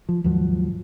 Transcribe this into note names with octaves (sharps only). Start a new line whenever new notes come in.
F3
D#2 G#2 F3 F#3